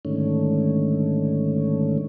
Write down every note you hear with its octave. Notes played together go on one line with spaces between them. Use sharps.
G#2 D3 D#3 A3 C#4